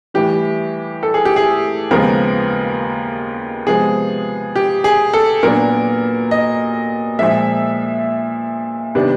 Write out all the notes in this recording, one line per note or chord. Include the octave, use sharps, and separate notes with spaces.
A2 E3 G3 G4
A4
G#4
G4
G#4
D#2 C#3 F3 G#3 B3 A#4
C3 F3 G#3 B3 G#4
G4
G#4
A4
A#2 F#3 B3 D4 A#4
D#5
A#2 F3 G#3 E5
C3 D#3 G3 B3 D4